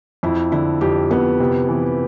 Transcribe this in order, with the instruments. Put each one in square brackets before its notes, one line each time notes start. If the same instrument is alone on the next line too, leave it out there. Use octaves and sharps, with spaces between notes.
[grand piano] F2 [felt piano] E4
[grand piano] D3 [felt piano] E4
[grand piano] F2 [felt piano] G4
[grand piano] F2 [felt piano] B3
[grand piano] C3
E3